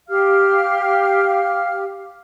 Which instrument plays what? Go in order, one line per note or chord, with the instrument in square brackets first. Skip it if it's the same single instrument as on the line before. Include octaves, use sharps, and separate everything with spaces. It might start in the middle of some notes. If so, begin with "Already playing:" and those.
[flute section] G4 F5 F6